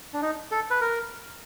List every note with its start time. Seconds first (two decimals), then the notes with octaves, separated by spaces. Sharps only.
0.14 D4
0.22 D#4
0.51 A4
0.71 B4
0.81 A#4